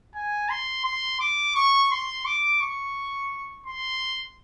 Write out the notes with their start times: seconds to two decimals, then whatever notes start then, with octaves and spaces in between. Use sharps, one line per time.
0.14 G#5
0.50 C6
0.84 C6
1.20 D6
1.56 C#6
1.91 C6
2.26 D6
2.61 C#6
3.67 C6